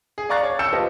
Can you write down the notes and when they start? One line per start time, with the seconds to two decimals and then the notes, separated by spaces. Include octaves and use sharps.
0.18 G#4
0.29 D5 F5 A#5 C#6 F#6 A6
0.43 C#5 C#6
0.59 E6 G6 C#7 E7
0.73 F4 G4 A4 B4 C5 D#5